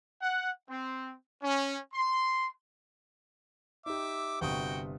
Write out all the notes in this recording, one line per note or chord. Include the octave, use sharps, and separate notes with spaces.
F#5
C4
C#4
C6
D#4 G4 E5 D6
G1 C3 F#4 G5 D#6